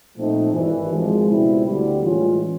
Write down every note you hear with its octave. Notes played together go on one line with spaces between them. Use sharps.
A#2 F3 A3 C4 D#4
G#1 G2 E3
G#1 G#2 F3 G#3
C#2 B2 G3 C4 E4
D2 D3 G3
A2 E3 G#3 C#4 F4